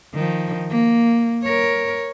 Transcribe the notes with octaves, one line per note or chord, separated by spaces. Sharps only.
D#3 F3
A#3
A#4 C#5